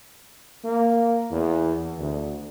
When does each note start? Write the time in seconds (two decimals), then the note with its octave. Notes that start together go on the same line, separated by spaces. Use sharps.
0.64 A#3
1.31 E2
1.98 D2